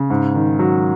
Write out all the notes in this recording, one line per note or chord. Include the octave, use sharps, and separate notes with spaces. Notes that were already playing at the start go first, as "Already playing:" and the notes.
Already playing: C#3
G#2
D#3
F#3